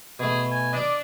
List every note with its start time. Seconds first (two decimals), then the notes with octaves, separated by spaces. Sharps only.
0.20 B2 A3 G#4
0.51 G#5
0.73 D4 D5 D#5